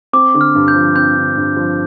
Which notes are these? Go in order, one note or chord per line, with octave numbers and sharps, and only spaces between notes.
C4 D6
D3
F6
G2
G6
F3
C4 G6
D3
G2
F3